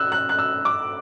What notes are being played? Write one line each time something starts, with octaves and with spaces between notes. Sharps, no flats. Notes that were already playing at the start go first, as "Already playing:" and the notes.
Already playing: E6 F#6
F#6
F#6
E6
D6